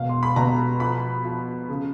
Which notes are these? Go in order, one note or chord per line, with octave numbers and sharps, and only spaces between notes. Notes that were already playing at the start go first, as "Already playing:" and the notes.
Already playing: E1 B2 F5
C6
B5
B2 A#5
F3 B5
F3
C#3